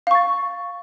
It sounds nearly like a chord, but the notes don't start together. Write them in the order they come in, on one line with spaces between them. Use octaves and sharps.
F5 C#6 A6